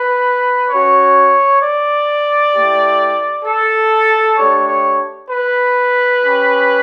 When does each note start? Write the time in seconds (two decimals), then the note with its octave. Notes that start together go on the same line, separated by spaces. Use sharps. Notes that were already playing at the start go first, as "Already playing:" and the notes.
Already playing: B4
0.70 C#4 F#4 C#5
1.62 D5
2.53 A3 E4 G4
3.45 A4
4.37 A3 D4 G4 C#5
4.68 C#5
5.29 B4
6.22 C#4 G4